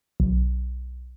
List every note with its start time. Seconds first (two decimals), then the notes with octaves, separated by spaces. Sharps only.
0.20 B1